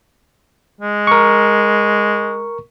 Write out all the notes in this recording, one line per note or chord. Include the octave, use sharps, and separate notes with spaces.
G#3
A#4 C#6